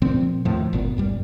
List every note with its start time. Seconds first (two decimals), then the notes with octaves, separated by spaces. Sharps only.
0.02 A#2 F3 C4
0.45 D#2 A2 F3
0.73 G1 A#2 B3
0.97 G1 F#2 G3